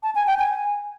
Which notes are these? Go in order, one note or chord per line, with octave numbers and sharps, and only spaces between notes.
A5
G#5
G5
G#5